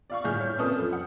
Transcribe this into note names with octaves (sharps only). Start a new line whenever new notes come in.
D5 F5 C#6
G1 A2 G#4 F6 G6
C#5
A#2 C4 C#4 A4 B4 D#6
F2
F#5